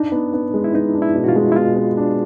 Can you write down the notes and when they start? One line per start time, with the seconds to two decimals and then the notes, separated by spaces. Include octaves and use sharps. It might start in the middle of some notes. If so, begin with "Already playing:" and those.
Already playing: D4 D#4
0.12 B3
0.34 B3
0.54 G#3
0.64 E4
0.74 B3 D#4
0.94 D4
1.02 E4
1.16 B2
1.24 F#4
1.28 F4
1.36 G#3
1.52 E4
1.56 B2 F4
1.77 B3
1.97 D4